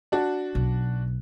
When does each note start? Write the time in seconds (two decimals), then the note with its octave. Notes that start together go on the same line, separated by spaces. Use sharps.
0.12 D4 F#4
0.55 B1